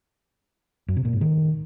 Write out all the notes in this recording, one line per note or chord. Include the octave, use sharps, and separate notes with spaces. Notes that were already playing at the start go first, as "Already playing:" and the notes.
F#2
C3
A#2
G#2
D#3